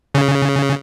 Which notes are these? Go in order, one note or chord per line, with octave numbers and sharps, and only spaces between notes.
C#3